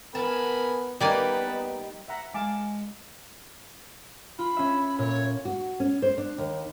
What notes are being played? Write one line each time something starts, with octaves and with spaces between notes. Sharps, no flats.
B3 A#4 G#5 A5 B5
G3 A#3 B3 D#4 B4 D5 G#5 A5
E5 F#5 A#5
G#3 F5 G#5 A5 D6
F4 B5
C#4 E5
A#2 C#5
F#4
C#4
C5
D4
D#2